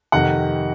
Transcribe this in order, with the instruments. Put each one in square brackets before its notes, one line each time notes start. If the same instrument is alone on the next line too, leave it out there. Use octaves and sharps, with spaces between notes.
[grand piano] F2 C3 D#3 F#5